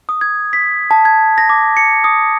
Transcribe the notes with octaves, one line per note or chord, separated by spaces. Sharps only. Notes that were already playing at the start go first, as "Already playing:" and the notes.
D#6
G#6
B6
A5
G#6
A#6
D6
C#7
D#6